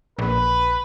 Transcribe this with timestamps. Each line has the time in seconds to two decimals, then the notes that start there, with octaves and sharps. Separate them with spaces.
0.19 A#1 B4